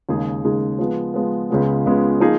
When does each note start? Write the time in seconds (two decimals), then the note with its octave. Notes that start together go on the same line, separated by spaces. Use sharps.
0.09 D#2 C#3 G#3 D#4 G#4
0.44 D#2 C#3 G#3 D#4 G#4
0.79 F3 G#3 B3
1.14 F3 G#3 B3
1.50 C#2 C#3 G#3 B3 F4
1.85 C#2 C#3 G#3 B3 F4
2.20 F3 A#3 D#4 G#4